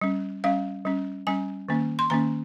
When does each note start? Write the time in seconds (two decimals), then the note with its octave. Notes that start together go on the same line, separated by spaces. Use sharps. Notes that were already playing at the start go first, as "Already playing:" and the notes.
0.02 G3 C#4
0.44 G3 C#4 F5
0.85 G3 C#4
1.27 G3 C#4 G#5
1.69 D#3 A#3 C#4
1.99 C6
2.10 D#3 A#3 C#4 A#5